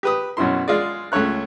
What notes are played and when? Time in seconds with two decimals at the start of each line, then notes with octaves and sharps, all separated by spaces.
0.03 G4 B4 D#6
0.37 F#2 B2 C#4 E4 C6
0.68 G#3 F4 G#4 D5
1.12 C#2 A3 C#4 C#5 F#6